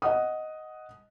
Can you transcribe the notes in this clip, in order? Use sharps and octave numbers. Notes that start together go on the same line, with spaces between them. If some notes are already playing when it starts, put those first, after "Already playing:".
D#5 F#5 D#6